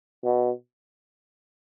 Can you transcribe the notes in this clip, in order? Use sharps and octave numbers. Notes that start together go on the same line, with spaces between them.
B2